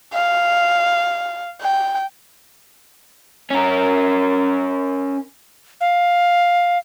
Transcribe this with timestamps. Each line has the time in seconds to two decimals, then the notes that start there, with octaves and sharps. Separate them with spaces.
0.14 F5
1.62 G5
3.51 C#4 A#4
5.81 F5